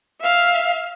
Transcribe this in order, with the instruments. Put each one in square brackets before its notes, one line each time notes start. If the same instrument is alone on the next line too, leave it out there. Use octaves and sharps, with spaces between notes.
[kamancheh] E5 F5